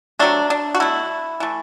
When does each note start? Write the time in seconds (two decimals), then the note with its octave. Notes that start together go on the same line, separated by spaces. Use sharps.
0.19 C3 F#3 A3 D4
0.50 D4
0.75 F#4
0.80 B2 A3 E4
1.40 E3 A3